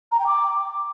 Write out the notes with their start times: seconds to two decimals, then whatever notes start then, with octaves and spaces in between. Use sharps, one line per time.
0.12 A#5
0.19 G5
0.27 D6